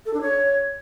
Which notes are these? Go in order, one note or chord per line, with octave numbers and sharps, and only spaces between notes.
A4
D4
C#5